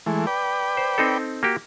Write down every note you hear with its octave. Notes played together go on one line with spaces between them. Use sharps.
E3 G#3 A3
B4 D5 G5
C5
C4 D#4 A4
A#3 F#4 G4